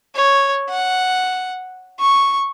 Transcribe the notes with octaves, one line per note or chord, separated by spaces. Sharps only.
C#5
F#5
C#6